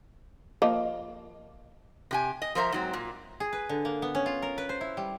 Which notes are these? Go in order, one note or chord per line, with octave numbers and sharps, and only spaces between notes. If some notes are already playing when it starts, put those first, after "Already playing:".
F3 A#3 D#5
C3 G4 G#5
D#5
F3 A#4 C5 D5 E5 A#5
G#2 F#3 C4
A#2
G#4
B4
D3
A#3
B3
C#4
F4
A#4
B4
C5
E4
G3